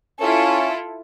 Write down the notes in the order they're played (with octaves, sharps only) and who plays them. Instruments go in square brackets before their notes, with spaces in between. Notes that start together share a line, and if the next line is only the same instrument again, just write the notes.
[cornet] C#4 [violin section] E4 F4 A4